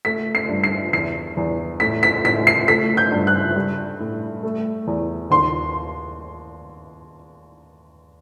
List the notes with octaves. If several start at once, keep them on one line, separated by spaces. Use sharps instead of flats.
A3 B6
C7
G2
C7
E2 C7
E2
A2 B6
B6
A2 B6
C7
A3 B6
G6
G2
F#6
G3
A2
A3
E2
D#2 C6